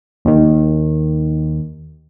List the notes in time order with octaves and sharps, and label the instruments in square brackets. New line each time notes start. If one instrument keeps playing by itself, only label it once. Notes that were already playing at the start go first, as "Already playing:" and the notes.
[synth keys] D#2 D#3